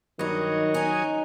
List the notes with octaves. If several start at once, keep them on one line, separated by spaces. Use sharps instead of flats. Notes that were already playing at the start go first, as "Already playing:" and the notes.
G2 D#3 F#3 D#4 C#5 D#5
C#4 D#4 G#5